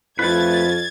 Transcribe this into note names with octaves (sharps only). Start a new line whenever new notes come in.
F2 A3 F4 B4 G#6 A6